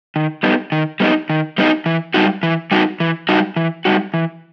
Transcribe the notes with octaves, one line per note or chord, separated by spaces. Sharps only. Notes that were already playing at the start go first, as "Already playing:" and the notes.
D#3
G3 B3 D#4
D#3
G3 B3 D#4
D#3
G3 B3 D#4
E3
G3 D#4 F#4
E3
G3 D#4 F#4
E3
G3 D#4 F#4
E3
G3 D#4 F#4
E3